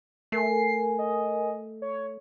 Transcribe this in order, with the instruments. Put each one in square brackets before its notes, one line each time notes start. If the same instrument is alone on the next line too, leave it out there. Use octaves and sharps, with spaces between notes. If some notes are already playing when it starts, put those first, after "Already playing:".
[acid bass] A3 [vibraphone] A#4 G#5 [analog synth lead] C7
[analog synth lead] D#5
C#5